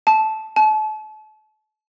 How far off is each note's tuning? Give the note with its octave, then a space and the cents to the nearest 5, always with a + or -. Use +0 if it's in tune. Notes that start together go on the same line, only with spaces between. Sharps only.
A5 -10
A5 -35